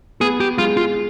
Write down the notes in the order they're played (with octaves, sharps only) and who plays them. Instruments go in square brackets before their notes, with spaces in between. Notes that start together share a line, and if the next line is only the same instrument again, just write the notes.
[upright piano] B3 [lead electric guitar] G#4
[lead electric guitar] G4
[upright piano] G#3 [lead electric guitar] F4
[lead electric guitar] F4